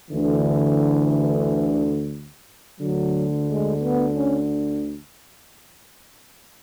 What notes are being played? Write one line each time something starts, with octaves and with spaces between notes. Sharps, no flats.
D2 D3 E3
D2 D3 F#3
G#3
B3
C#4